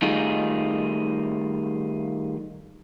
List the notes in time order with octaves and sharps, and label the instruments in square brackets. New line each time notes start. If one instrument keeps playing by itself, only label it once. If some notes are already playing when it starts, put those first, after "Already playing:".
[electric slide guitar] D#3 G3 A3 D#4 F4 G#4